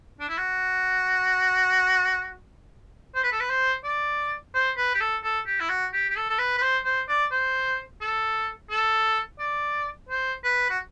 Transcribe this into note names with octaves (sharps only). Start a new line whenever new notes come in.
D4
E4
F#4
C5
B4
A4
B4
C5
D5
C5
B4
G4
A4
A4
G4
E4
F#4
G4
G4
A4
A4
B4
B4
C5
C5
D5
C5
A4
A4
D5
C5
B4
F#4